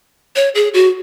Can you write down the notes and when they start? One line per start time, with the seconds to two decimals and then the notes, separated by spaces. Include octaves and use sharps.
0.36 C#5
0.55 G#4
0.74 F#4